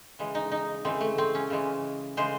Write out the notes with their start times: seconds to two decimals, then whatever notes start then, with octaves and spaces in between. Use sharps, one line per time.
0.19 C#3 E3 G#3
0.35 D#4
0.52 D#4
0.85 C#3 E3 G#3 C4
1.01 A3
1.18 C4
1.35 C#4
1.50 C#3 E3 G#3
2.17 C#3 E3 G#3 C5